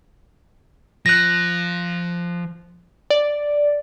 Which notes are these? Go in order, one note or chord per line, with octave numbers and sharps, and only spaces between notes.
F3 F#6 A#6
D5